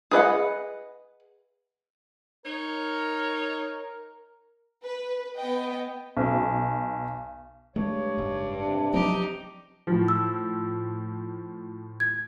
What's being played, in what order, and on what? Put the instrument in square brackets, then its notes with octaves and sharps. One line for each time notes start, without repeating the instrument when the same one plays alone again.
[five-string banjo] G#4 B4 D#5 F#5
[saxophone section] D#4 C#5 [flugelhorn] A#4
[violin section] B4
B3 D#5 G5
[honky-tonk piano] B1
[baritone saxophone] G2 [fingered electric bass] G#3 A3 [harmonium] C#5
[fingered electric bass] F#1 G#2
[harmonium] C3 D4
[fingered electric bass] F3 F#3 C4 [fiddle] D#4 G4
[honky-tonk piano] A2 F3
[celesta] E6
G#6